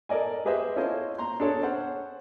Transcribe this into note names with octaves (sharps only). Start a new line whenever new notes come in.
A4 A#4 D5 D#5 G#5
G4 G#4 B4 C5 D#5 E5
C#4 E4 F4 A4 C5 D#5
A#5 C6
D4 G#4 A4 C#5
C#4 C5 F#5